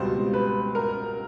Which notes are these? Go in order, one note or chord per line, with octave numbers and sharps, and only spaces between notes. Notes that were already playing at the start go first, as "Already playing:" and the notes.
Already playing: C#2 B2 G3 C4 C5
B4
A#4